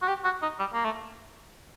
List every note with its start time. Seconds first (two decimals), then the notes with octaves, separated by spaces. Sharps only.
0.02 F#4
0.08 G4
0.25 F#4
0.42 D#4
0.59 G3
0.73 A#3
0.85 A3